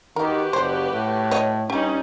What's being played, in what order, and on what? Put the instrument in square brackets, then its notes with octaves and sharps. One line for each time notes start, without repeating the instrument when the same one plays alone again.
[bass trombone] D#3 [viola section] F#4 G4 B4 [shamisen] A#4
[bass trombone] F#1 [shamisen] C5
[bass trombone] A2
[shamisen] C#5 D#5
[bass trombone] G2 [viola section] G3 C#4 D#4 [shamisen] G4